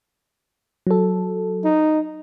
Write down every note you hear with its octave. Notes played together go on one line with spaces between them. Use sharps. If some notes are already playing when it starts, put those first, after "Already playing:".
F#3 A4
D#4